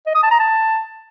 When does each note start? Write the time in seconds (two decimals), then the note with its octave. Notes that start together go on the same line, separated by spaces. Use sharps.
0.07 D#5
0.15 D#6
0.23 A5
0.31 A#5
0.40 A5